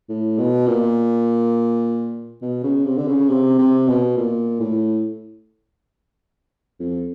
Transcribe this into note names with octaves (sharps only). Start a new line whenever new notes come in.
A2
B2
A#2
B2
C#3
C3
D3
C#3
C3
C3
B2
A#2
A2
F2